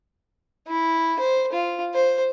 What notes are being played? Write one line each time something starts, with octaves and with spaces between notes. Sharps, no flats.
E4
C5
F4
C5